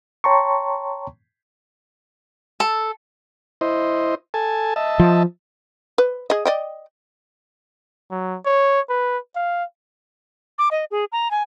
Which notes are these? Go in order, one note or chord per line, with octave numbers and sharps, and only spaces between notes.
C#5 G5 A5 A#5 C6 C#6
A4
E4 C5 D#5
A4 G#5 A5
D#5 E5 A5
F3
B4
G#4 D#5
D5 D#5 G5
F#3
C#5
B4
F5
D6
D#5
G#4
A#5
G#5